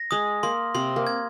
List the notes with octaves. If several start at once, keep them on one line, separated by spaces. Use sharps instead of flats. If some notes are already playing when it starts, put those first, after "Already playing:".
Already playing: A#6
G#3 D#6
A#3 C6
C3 C4 C6
A#3
G#6